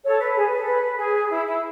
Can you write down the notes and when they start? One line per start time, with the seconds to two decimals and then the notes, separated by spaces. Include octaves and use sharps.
0.03 A4 C#5
0.20 B4
0.35 G#4
0.46 B4
0.56 A4
0.67 B4
0.98 G#4
1.30 E4
1.46 E4